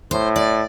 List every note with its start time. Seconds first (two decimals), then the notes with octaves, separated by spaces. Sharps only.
0.11 A2 C5
0.36 D5